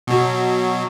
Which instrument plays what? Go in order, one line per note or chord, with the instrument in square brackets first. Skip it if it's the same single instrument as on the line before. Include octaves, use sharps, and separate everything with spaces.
[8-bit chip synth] B2 F#3